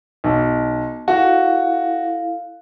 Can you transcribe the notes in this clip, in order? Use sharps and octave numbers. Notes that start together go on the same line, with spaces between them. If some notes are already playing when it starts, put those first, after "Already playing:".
B1
E4 F#4 A4 F5